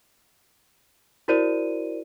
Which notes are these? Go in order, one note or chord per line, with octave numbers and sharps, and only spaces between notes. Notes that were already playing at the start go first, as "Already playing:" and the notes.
E4 F#4 A#4 C5 D5 D#7